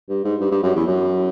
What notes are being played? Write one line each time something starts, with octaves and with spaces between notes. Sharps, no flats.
G2
G#2
G2
G2
F#2
E2
F#2